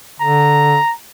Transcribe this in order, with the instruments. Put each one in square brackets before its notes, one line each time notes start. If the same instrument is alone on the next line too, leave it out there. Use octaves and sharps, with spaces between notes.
[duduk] D3 [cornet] A#5